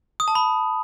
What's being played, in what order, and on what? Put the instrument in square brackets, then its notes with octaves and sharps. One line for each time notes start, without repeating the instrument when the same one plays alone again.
[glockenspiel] D#6
A5
B5